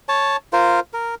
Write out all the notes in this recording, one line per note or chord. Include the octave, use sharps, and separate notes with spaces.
C#5 A5
F4 A#4 C5
A#4